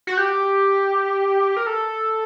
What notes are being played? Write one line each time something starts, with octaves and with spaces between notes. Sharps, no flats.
F#4
G4
A#4
A4